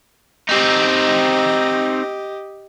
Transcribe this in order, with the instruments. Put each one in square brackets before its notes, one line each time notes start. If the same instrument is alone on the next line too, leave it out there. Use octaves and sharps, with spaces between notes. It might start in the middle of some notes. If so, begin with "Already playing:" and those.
[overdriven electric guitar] C4 D#4 [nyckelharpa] G4 D#5